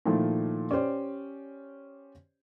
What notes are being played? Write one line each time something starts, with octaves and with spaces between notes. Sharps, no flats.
A#2 D#3 F3 A3 E4
C#4 G4 C5 D5